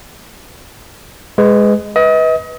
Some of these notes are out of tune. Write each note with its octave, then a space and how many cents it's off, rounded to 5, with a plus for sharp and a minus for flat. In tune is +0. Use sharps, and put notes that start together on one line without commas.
G#3 +0 B4 +25
B4 +0 D#5 +35